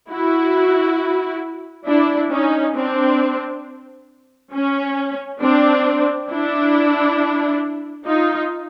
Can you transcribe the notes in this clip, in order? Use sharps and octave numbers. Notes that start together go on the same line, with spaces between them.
E4 F#4
D4 E4
C#4 D#4
C4 D4
C#4
C4 D4
D4 E4
D#4 F4